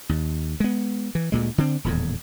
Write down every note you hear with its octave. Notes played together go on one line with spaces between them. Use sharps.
D#2
G#3 B3
E3
D2 A#2 G#3
D3 C4
D#1 E2 A2